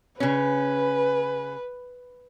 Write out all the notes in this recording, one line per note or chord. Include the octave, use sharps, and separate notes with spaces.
C#3 C#4 B4